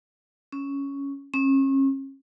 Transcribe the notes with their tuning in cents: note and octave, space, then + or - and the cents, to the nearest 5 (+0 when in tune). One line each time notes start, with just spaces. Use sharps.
C#4 +5
C#4 -35